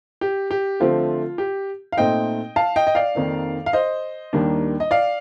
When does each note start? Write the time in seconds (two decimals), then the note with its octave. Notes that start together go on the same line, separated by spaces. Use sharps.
0.21 G4
0.51 G4
0.80 D3 F3 A3 C4 F4
1.38 G4
1.92 F5
1.97 A#2 A3 C4 D#4 D#5 G5
2.56 F5 A5
2.76 D#5 G5
2.87 D#5
2.95 D5 F5
3.15 F2 D#3 A#3 D#4
3.66 F5
3.73 C5 D#5
4.33 D#2 D#3 G3 A#3 D4
4.80 D#5
4.91 D5 F5